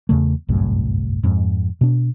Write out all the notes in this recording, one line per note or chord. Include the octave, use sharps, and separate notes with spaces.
E2 C#3 A3
G1 C2 F#2 A2
F2 G#2
B2 D4